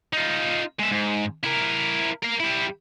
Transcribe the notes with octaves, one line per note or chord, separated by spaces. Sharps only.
D#4 F4
G#3 E5
G#2
E4 A#4
A#4 F5
G3 E4